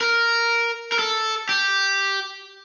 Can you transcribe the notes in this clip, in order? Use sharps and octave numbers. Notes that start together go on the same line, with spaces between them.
A#4
A#4
A4
G4